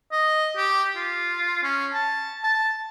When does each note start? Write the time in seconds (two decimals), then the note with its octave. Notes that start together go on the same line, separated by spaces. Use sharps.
0.12 D#5
0.57 G4
0.96 F4
1.63 C#4
1.94 A5
2.44 A5